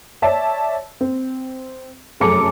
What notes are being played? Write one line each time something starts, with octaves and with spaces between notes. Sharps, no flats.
C#5 D5 E5 A5
C4
F1 F#2 G#4 A4 D6 C#7